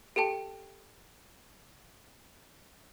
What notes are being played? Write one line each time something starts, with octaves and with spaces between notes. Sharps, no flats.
G4 A4 G5 A5